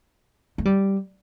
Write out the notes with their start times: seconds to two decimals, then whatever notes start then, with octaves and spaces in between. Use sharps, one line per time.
0.58 A3
0.65 G3